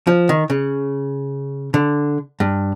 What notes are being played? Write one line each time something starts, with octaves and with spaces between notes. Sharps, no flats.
F3
D#3
C#3
D3
G2